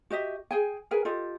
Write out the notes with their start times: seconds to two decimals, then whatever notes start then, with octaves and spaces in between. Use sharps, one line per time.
0.10 F#4 G4 D#5 E5
0.51 G#4 G5 G#5
0.91 G#4 A#4 B4 G#5
1.05 F4 G4 A4 D#5